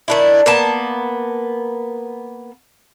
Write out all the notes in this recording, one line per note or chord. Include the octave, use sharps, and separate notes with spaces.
D#3 D4 E4
A#3 B3 A5